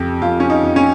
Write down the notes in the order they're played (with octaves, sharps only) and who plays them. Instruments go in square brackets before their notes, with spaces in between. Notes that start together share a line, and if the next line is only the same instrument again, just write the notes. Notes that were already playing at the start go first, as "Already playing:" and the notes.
Already playing: [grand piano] F2 C#3 G4
F2 F4
C#4
D#4
F2
C#4